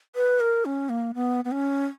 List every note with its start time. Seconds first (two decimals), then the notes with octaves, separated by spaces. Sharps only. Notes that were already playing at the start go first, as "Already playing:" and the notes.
0.16 B4
0.40 A#4
0.65 C#4
0.89 A#3
1.15 B3
1.45 B3
1.52 C#4